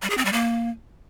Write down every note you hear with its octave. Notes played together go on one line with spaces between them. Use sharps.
G3
G#4
C4
G3
A#3